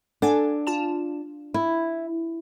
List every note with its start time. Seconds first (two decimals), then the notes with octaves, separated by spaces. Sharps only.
0.22 D4 A4 F#5 G#5
0.67 F4 A5 E7
1.54 E4